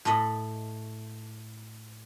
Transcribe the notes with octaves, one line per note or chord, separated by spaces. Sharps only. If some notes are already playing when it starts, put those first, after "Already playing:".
A2 A4 D#5 B5